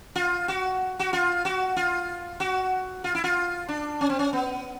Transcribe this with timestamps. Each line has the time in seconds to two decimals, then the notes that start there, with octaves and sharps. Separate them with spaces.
0.15 F4
0.48 F#4
0.99 F#4
1.13 F4
1.45 F#4
1.77 F4
2.40 F#4
3.04 F4
3.15 E4
3.24 F4
3.68 D4
4.01 C#4
4.10 C4
4.19 C#4
4.33 B3